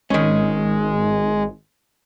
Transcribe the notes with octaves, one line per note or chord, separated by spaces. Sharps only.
G#1 D#3 G#3 C#4